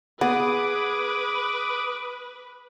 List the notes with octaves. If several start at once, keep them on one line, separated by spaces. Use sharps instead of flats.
B3 G#4 B4 D6 D#6